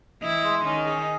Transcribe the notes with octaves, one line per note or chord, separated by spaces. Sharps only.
E3 E4 D#5
G#3
D#3 C#4 D#4
G#4